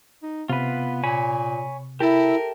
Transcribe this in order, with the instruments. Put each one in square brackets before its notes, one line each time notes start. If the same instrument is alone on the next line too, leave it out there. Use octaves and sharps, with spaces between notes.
[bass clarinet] D#4
[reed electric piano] C3 [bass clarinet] B3 [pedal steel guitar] F4 B4
[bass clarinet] A#2 [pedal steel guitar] C#5 G#5 B5
[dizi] E4 [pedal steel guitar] G4 A4 E5 [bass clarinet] A#4